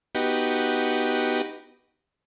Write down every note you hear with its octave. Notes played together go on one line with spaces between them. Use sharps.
B3 D#4 F#4 G4